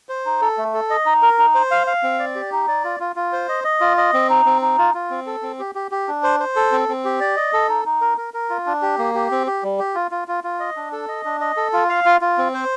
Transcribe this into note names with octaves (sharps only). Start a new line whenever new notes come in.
C5
D#4
A4
A3
A4
D#5
D#4
A#4
D#4
C5
F5
F5
C4
D5
G4
D#4
D5
F4
F4
F4
C5
D#5
D#5
F4
D#5
C4
D#4
C4
D#4
F4
F4
C4
A4
C4
G4
G4
G4
D4
C5
C5
A4
C4
C4
G4
D5
D#5
A4
D#4
D#4
A#4
A#4
A#4
F4
D4
G4
A#3
G4
C4
G4
G3
G4
F4
F4
F4
F4
D#5
D4
A4
D#5
D4
D#5
A4
F4
F5
F4
F4
C4
C5